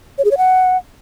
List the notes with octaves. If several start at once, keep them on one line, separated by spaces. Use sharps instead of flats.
C#5
G#4
C#5
F#5